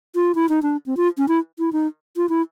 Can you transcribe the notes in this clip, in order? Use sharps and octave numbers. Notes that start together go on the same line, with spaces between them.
F4
E4
D#4
D4
C4
F4
C#4
E4
E4
D#4
F4
E4